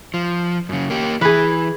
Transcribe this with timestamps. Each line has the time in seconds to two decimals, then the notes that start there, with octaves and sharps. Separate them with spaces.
0.14 F3
0.69 F#2 C#3
0.90 A#3 G4
1.21 E3 G#4 B4